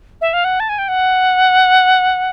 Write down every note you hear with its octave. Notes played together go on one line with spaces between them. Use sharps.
E5
F5
F#5
A5
G#5
G5
F#5